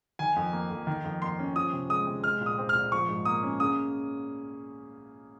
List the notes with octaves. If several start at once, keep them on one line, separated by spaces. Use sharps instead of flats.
D#3 G#5
F2
A#3
F2
D#3
F2
A#3 C6
C#4
F3 D#6
C3
G#3 D#6
C3
G#3 F6
A#2
D#6
C4
F6
A#2
F3 C#6
G#2
A#3 D#6
C#4
C#3 D#6